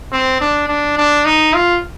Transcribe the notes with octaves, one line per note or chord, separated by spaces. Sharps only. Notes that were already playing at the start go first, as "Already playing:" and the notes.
C4
D4
D4
D4
D#4
F4